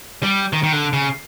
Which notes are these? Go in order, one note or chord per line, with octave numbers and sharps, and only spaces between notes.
G3
D#3
D#3
D3
C#3